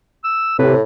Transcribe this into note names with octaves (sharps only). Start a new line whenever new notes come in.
E6
A2 C3 B4